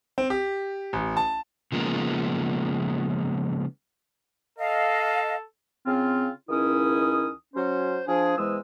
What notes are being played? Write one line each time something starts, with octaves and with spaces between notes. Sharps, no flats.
C4
G4
A1
A5
C#3 F3 G#3 A#3 B3
A4 D#5 F5
C#3 C4 F4
C#2 D#3 C#4 E4 D#6
F#3 C#4 C5
F3 D4 G#4
E2 E3 G#3 C5 D#6 E6